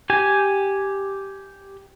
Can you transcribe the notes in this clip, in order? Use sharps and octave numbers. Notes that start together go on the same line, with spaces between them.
G4 G#5